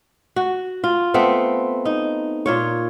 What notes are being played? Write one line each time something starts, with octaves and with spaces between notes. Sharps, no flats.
F#4
F4
A3 B3 C4
D#4
A#2 F4 C#5